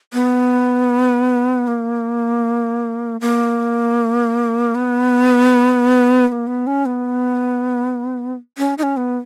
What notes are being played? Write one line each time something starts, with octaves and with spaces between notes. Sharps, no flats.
B3
A#3
A#3
B3
B3
A#3
B3
C#4
B3
C#4
D#4
C#4
B3